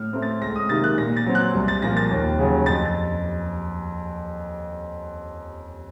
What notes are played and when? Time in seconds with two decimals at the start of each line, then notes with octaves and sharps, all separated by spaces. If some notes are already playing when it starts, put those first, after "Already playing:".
Already playing: A2 F6
0.13 A3 C4
0.22 A6
0.41 C#2 A#6
0.56 D#6
0.69 C3 D#3 A#3 A6
0.84 F#6
0.98 A#2 A#6
1.17 A6
1.26 F#3 C4
1.35 F#6
1.55 C2
1.68 A6
1.82 A#2 F3 A#3 A#6
1.97 A6
2.11 D#2
2.39 C#3 F#3
2.66 F2 A6
2.85 A6